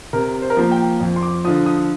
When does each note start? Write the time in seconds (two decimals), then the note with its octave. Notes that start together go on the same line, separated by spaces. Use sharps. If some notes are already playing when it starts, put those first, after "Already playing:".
0.13 C3 A#4
0.42 C5
0.50 A#4
0.57 F3 A#3 C5
0.71 G5
1.00 F2
1.16 C6
1.23 D6
1.44 D3 F3 D#6
1.66 D#6